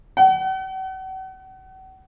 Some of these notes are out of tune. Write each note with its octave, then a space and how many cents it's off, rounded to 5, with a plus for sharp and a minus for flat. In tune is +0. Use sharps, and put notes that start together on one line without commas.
F#5 +40